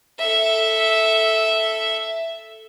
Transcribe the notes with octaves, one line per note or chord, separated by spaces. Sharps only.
A4 E5